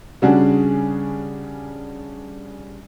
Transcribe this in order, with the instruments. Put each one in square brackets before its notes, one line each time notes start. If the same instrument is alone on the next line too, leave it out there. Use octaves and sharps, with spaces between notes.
[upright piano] C#3 G3 C#4 D4 F#4 G#4